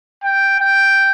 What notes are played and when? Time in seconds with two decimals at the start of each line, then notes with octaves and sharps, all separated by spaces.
0.23 G5
0.59 G5